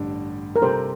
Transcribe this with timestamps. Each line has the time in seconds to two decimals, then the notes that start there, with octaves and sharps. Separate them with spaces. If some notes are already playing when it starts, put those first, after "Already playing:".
Already playing: A1 G2 D3 G3 D4
0.56 A#4
0.62 C3 G3 C4 A4 C5